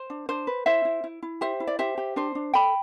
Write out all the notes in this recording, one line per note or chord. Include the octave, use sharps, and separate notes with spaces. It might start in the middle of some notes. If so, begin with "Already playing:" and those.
Already playing: C5
D4
D4 C5
B4
E4 C5 E5
E4
E4
E4
G4 C5 E5
E4
D5
G4 C5 E5
G4
D4 C5
D4
A4 G5 B5